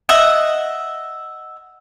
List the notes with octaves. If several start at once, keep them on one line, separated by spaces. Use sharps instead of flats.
D#5 E5 F#5